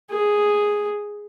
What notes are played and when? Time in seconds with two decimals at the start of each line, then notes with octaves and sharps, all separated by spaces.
0.11 G#4